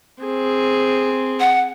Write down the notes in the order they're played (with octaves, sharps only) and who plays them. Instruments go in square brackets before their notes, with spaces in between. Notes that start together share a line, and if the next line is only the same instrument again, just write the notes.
[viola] C4 G#4
[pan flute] F#5